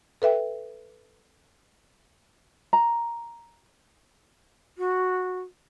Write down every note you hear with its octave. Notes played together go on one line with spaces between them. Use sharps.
A4 B4 E5 G5
A#5
F#4